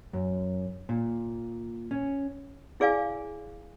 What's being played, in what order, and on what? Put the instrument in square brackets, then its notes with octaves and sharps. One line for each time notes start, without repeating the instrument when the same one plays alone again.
[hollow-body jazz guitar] F#2
A#2
C#4
[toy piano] E4 G#4 D5 F5 G#5